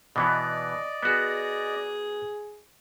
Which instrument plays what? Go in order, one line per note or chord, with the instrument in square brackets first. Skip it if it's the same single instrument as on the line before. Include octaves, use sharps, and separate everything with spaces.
[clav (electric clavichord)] B2 E3 B3 [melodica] D5 D#5
[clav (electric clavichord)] B3 F#4 [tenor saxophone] G#4